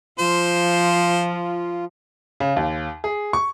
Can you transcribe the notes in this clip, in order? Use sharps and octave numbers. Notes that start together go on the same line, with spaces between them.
F3 F4 C5
C#3
D#2
G#4
C#6